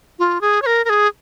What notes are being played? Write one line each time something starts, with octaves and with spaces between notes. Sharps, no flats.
F4
G#4
C#5
A#4
A#4
G#4